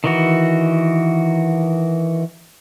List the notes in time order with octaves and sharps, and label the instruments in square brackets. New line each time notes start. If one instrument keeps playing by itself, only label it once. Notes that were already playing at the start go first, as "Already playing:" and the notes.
[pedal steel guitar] D#3 E3 F#4